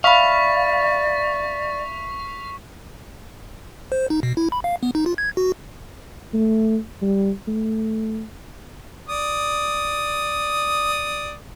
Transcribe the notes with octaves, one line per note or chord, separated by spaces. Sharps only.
D5 E5 F5 B5 C#6 B6
C5
D#4
B2
E4
B5
F5
B3
D#4
F4
G#6
F#4
A3
G3
A3
D5 D#6